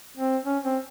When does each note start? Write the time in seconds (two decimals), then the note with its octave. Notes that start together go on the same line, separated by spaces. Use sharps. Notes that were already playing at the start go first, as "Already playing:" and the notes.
0.18 C4
0.45 C#4
0.64 C4